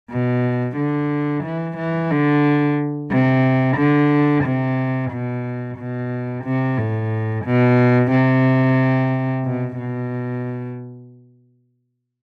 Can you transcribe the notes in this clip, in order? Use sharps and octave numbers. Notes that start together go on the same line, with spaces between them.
B2
D3
E3
E3
D3
C3
D3
C3
B2
B2
C3
A2
B2
C3
B2
B2